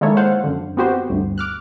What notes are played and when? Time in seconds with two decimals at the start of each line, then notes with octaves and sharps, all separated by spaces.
0.01 D#3 G#3 A#3 E4 A4 C#5
0.17 C5 F5 F#5
0.44 F#2 D3
0.77 B3 C4 F#4 G4 C5
1.10 G1 D2
1.38 D6 F6 F#6